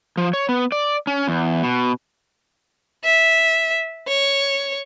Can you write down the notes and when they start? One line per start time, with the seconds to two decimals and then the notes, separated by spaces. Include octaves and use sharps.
0.17 F3
0.33 C#5
0.49 B3
0.72 D5
1.07 C#4
1.28 E2
1.63 B2
3.04 E5
4.08 C#5